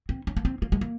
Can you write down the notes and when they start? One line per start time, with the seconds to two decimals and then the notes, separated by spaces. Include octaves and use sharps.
0.09 C4
0.27 C#4
0.37 A#3
0.45 C4
0.62 A#3
0.72 G#3
0.81 A#3